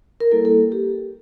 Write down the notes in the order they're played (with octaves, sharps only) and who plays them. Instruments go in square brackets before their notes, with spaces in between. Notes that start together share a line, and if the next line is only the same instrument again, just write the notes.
[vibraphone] A#4
G3 A#3 E4 A4
A4
G4